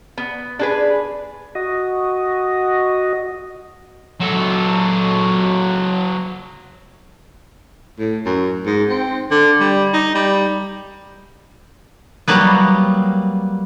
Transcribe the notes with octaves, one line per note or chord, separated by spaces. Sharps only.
B3
D4 G#4 B4
F#4 D#5
F#3 A4
A2
F#2
G#2
C4
D3
G3
D#4
G3
F#3 G3 A#3 B3